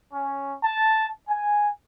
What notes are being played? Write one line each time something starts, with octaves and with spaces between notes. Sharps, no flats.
C#4
A5
G#5